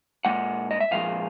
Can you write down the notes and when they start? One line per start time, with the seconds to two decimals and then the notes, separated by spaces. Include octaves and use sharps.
0.25 A#2 F3 G#3 F#5
0.71 D#5
0.80 E5
0.91 A#2 F3 G#3 F5